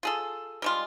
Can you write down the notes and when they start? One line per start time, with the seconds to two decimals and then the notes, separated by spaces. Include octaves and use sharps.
0.03 F4 G#4 A4
0.62 G3 G#3 F4